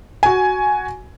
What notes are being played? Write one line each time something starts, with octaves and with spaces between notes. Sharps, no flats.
F#4 G#5